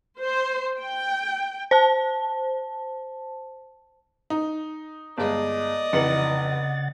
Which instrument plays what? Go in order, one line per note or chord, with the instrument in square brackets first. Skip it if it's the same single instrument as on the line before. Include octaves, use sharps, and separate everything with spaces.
[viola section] C5
G5
[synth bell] C5 A5
[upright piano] D#4
[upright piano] G1 G#3 [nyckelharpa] D5 D#5
[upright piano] F1 E3 F#7 [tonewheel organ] C#3 F#5 A6